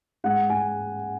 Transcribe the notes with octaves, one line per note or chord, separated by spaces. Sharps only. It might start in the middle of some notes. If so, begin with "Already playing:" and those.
G#2 F#5
G#2 G#5